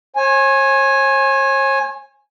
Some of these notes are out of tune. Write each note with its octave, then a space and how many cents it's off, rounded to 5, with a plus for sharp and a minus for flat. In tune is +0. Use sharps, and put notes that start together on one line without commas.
C#5 -45 G#5 +0